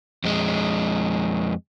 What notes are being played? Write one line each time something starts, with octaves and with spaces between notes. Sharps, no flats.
F2 G#3